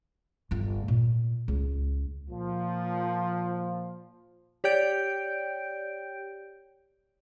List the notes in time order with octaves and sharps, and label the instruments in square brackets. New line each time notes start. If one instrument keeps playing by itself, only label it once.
[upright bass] G1 F4
A#2
C#2
[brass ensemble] A#2 F3
[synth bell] G4 C#5 D5 G5 G6 D7